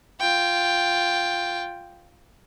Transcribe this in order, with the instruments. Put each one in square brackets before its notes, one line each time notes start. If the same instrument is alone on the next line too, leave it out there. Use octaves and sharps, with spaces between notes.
[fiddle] F4 G5